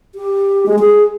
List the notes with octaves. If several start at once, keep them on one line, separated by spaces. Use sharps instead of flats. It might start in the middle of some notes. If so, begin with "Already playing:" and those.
G4
G#3
G#4